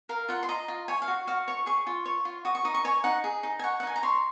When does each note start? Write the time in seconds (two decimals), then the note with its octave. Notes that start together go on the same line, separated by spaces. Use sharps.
0.09 A#4 F5
0.28 F4 F#5
0.43 C6
0.49 D#5 A#5
0.68 F4
0.88 C#5 G#5
1.02 F5
1.08 F#4
1.27 F#4 F5
1.48 C#5 C#6
1.66 G#4 C#6
1.87 F4
2.06 C#5
2.25 F4
2.45 F#4 D#6
2.55 C#6
2.65 D#4 D#6
2.74 C#6
2.85 C#5 G#5
3.04 D#4 F#5
3.24 G#4
3.43 D#4
3.59 G#5
3.63 C#5 F#5
3.80 F#5
3.83 D#4 G#5
3.96 A#5
4.03 C#5 C6